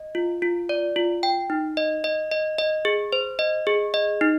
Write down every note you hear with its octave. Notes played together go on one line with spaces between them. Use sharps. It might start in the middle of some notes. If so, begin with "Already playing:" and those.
Already playing: D#5
F4
F4
D5
F4
G5
D#4
D#5
D#5
D#5
D#5
G#4
C5
D#5
G#4
D#5
D#4